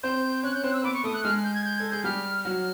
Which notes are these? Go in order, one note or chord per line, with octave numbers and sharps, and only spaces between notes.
C4 C5 G6
C#4 C#5 F#6
G6
C4 C5 F#6
E6
B3 B4 D6
C#6
A3 A4 D#6
F#6
G#3 G#4 F6
G6
G#6
G6
A4 G#6
G#4 G6
G3 G4 F6
F#3 F#4 F6